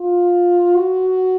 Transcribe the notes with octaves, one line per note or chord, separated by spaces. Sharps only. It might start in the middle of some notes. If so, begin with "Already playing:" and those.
Already playing: F4
F#4